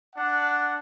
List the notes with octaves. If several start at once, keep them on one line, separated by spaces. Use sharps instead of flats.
D4 F#5